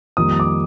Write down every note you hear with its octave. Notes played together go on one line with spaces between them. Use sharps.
F2 D#3 G3 A#3 D#6
D6